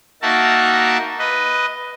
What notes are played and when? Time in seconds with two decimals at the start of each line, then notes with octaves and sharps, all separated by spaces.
0.22 A#3 D#4 F#4 A#4 E5 A5
1.19 B4 D#5